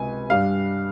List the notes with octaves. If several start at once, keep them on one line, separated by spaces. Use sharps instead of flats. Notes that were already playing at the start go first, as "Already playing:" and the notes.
Already playing: C#2 C3 G#5
G2 G3 F5